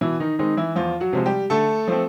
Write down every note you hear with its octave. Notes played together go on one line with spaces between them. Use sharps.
B2 E3 E4
D#3 D#4
D#3 G#3 C4 D#4
E3 E4
E2 F3 F4
F#3 F#4
C3 F3 G#3
G3 G4
D3 A3 A4
F3 A3 C4